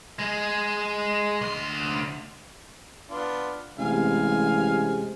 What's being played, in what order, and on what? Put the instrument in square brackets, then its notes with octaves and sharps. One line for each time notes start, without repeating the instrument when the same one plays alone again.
[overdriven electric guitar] G#3
D2 C6
[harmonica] B3 D4 F4
[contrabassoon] A1 [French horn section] C3 G#3 [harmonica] F5 G#5